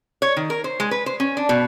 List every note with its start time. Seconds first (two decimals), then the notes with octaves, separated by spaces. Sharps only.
0.22 C#5
0.37 D#3
0.50 A#4
0.64 C5
0.80 G#3
0.91 B4
1.06 C5
1.20 C#4
1.37 D4
1.49 B2